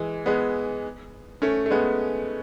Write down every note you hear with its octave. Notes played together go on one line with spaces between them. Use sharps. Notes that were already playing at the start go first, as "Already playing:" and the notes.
Already playing: E3 G#3
G#3 B3
A3 C#4
A3
G#3 B3